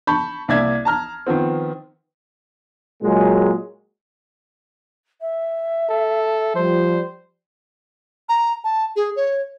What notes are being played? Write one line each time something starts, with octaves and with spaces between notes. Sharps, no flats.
A5 B5 C#6 G6
C2 A#3 D5 E5 G#6
A5 A#5 F6
D#3 F3 B3 C4
A#2 F#3 G#3
E5
A4
F3 G3 C5
A#5
A5
G#4
C#5